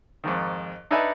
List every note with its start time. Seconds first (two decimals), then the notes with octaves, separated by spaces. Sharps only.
0.24 F2 G#2 D#3
0.91 D4 D#4 A4 B4 E5 G#5